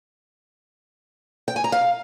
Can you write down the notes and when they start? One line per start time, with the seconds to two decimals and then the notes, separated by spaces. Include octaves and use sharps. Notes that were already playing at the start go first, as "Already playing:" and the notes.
1.48 G5
1.56 G#5
1.64 A#5
1.72 F5